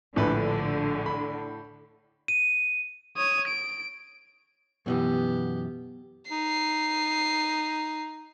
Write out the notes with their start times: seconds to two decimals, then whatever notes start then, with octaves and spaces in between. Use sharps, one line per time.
0.16 A#1 A2 D3 B4
1.06 B5
2.28 D#7
3.17 C#5 D#6
3.47 D7
4.86 F#2 B2 E3 B3 G4
6.31 D#4 C7